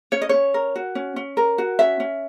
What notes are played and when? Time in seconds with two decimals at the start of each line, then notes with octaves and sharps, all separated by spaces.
0.12 C#4 C#5
0.22 D#5
0.29 C#4 C#5
0.54 A#4
0.76 F#4
0.95 C#4
1.16 C#4
1.37 A#4
1.58 F#4
1.79 C#4 E5
2.00 C#4